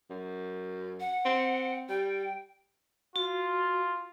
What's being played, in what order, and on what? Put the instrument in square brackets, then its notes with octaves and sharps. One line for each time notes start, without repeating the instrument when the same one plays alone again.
[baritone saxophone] F#2
[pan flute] F#5
[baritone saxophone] C4
[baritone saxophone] G3 [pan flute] G5
[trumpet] F4 [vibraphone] F#4